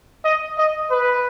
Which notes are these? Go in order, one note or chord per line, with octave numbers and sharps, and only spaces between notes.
D#5
D#5
B4